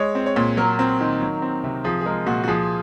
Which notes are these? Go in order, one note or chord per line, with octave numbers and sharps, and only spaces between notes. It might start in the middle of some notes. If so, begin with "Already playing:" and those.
Already playing: G#3 C#5
C4
C#5
A#2
F#3 A#4
C4
D#3
F#3
C4
C3
F3 G#4
G#4
G#3 A#4
A#2 F#4
F#4
F3 G#4